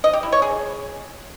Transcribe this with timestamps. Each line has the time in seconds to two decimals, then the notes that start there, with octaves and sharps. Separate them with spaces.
0.04 D#5
0.13 G4
0.23 E4
0.32 C#5
0.42 G#4